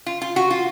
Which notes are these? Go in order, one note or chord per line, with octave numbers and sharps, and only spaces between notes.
F4
F4
F#4
F4